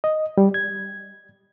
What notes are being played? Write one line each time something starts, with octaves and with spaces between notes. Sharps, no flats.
D#5
G3
G#6